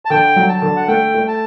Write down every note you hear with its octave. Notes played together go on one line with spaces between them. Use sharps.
A5
D3 G5
F#3
A5
D3
F#5
A3 G5
A3
A5